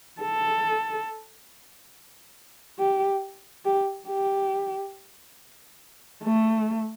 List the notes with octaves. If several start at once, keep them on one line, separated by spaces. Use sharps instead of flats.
A4
G4
G4
G4
A3